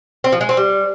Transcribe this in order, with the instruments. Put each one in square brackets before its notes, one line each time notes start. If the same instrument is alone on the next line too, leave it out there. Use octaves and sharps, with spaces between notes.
[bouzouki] C4
F3
G#3
C4
G3